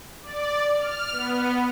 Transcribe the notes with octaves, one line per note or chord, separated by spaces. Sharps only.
D5
F6
B3